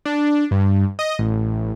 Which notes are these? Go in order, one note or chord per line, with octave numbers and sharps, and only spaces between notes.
D4
G2
D#5
A1